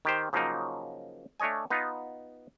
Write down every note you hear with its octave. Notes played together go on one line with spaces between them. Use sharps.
D#3 G4 C5
C#3 F3 F#3 A#3 D#4
A3 D4 C#5 D#5 G#5
B3 D#4 F4